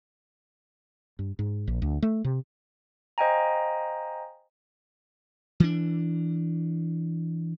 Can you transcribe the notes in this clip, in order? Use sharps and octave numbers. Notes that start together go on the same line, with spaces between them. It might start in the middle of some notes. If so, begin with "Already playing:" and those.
G2
G#2
A#1
D2
A3
C3
C5 D#5 F5 G5 G#5 A#5
E3 D4